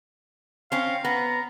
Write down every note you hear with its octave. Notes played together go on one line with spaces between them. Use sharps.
C4 C#4 F5
B3 A#5